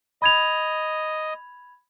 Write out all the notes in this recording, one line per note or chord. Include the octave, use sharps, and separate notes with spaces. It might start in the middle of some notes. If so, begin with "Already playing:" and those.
D#5 B5 G#6 F7